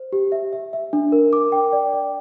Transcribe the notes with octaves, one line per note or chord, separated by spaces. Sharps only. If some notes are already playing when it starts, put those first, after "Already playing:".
Already playing: C5
G4
E5
E5
E5
D4
A#4
D6
G5
D5
D5